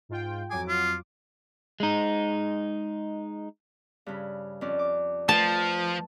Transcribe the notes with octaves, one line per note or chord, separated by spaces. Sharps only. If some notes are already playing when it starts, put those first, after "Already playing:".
G#2 F4 G5
F2 F#3 G#5 D6
F4
G#3 D#4
G2 C#3 B5
F2 C#4 D5
D6
F3 A3 B4 A5